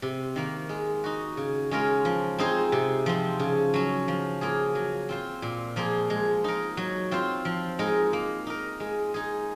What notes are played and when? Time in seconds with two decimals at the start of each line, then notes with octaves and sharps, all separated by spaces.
0.02 C3
0.36 D#3 A#3
0.69 G#3
1.04 D#4 F#4
1.37 C#3
1.71 G#3 C#4 F4 A#4
2.05 F3
2.38 C4 D#4 G#4 C5
2.72 C3
3.06 F3 C4
3.40 C#3
3.74 F#3 C#4
4.08 F3
4.41 A#3 F4 G#4
4.75 F#3
5.09 C4 F4 C5
5.42 A#2
5.76 F3 A#3 F4 G#4
6.10 G#3
6.44 D#4 A#4
6.77 F#3
7.11 C4 F4 C5
7.45 F3
7.79 G#3 D#4 A#4
8.13 A#3
8.47 D#4 A#4
8.80 G#3
9.14 D#4 G#4